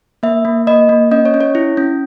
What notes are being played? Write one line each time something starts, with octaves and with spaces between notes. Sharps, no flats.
A#3 E5
A#3
A#3 D#5
A#3
C#4 D#5
C#5
C#4
C#5
E4
C#4